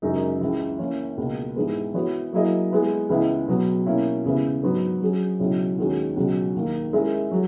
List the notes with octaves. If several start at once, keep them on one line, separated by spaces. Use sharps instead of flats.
F#2 C#3 G#3 D#4 A#4
C#2 C#3 E3
E3 A#3 C#4
C#2 B2 A#3
G#2 E3 G#3 B3
E3 B3 F#4 C#5
F#3 A#3 E4 G#4 D#5
G#3 B3 E4
C#2 C#3 E3 B3 E4
B2 F#3 B3
B2 A#3 C#4 E4
E2 C#3 G#3 B3 E4
G#2 F#3 B3
F#3 C#4 G#4
C#2 B2 F#3 C#4 E4
D#2 D#3 G#3 C#4 F#4
C#2 B2 F#3 C#4 F#4
D#2 D#3 A#3
G#3 C#4 E4 A#4 E5
F#3